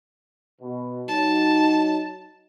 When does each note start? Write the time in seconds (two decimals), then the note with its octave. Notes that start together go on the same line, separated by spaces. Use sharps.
0.61 B2
1.08 F#3 D#4 A5